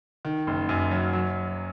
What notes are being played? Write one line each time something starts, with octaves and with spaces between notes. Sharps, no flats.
D#3
F#1
F#2
F#3
F#3